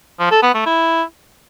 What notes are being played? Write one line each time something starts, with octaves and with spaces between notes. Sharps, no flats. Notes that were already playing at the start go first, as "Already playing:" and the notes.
F3
A4
B3
A3
E4